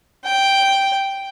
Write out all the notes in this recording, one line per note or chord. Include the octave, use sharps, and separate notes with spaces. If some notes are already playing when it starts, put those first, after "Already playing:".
G5